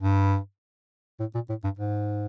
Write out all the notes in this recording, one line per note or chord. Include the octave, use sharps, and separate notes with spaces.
G2
A2
A#2
A2
G2
G#2